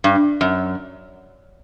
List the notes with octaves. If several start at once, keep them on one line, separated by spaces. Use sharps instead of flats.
G2
F#2